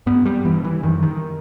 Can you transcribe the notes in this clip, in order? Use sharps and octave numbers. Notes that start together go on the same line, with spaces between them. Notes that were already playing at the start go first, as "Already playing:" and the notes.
G2 B3
G3
G2 E3
E3
F#2 D#3
D#3